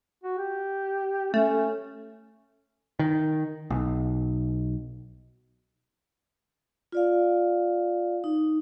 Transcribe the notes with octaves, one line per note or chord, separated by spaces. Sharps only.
F#4
G4
A3 C#4
D#3
B1
F4 D5 F5
D#4